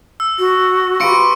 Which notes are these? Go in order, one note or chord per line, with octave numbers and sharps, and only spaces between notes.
E6
F#4
F4 G4 B4 C#6 C#7 D7